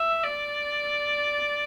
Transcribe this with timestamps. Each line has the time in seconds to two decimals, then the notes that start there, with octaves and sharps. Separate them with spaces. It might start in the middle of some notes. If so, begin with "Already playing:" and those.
Already playing: E5
0.24 D5